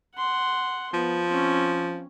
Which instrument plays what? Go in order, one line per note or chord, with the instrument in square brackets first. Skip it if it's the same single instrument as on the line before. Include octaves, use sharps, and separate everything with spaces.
[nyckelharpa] F#5 C6
[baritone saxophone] F3 [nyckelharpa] B3
[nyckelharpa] C4 C#4